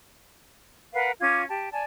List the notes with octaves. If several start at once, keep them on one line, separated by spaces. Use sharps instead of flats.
A#4 B4 F5 F#5
C#4 F4 D6 G#6
G4 A5
D5 G#5 A5